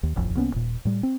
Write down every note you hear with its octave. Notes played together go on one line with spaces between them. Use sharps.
D#2
D#1 A1 F2
C2 A#3 B3 C#4
D#1 A#2
A2 G3
C4